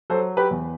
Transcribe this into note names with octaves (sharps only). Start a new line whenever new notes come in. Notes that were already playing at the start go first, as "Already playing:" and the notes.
F#3 A4 C5
G4 B4
E2